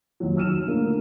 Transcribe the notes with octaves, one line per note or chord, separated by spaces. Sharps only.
D#2 F#3
E6 F6 D#7 E7
D3 A3 A#3